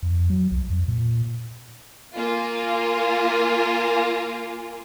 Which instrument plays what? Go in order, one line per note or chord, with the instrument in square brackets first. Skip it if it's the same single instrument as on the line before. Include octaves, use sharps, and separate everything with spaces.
[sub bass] F2
F#3
C2
F2
A#2
[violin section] A#3 F4 G#5